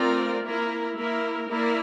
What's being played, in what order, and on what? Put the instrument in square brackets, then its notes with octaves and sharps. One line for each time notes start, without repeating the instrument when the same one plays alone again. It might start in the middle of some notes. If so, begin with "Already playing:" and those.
Already playing: [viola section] A3 C4 F4 A#4 D5
A#3 E4 A#4
A#3 E4 A#4
A#3 E4 A#4 D5